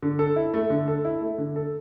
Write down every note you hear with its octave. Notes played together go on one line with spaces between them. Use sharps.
D3
A4
E4
A3
D3
A4
E4
A3
D3
A4